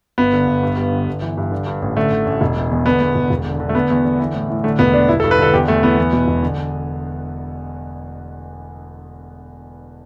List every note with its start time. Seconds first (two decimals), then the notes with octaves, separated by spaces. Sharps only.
0.18 G1 B3
0.33 D3
0.48 G1
0.63 G2
0.77 G2
0.92 D3
1.08 G1
1.22 E3
1.37 G2
1.52 D3
1.67 G2
1.82 A1
1.97 D3 A3
2.12 D3
2.26 A1
2.41 E1
2.56 E3
2.71 E2
2.86 D3 B3
3.01 E2
3.15 E1
3.30 E1
3.45 D3
3.60 D3
3.69 A3
3.75 D3 B3
3.90 E2
4.05 D3
4.19 E3
4.34 A2
4.50 A2
4.64 D3 A3
4.79 E1 B3
4.94 E1 D4
5.09 G2 E4
5.20 A4
5.24 G2
5.31 B4
5.38 D3 A4
5.53 E2 G4
5.68 E2 A3
5.83 E3 B3
5.98 E2
6.13 B2
6.28 E1
6.43 D3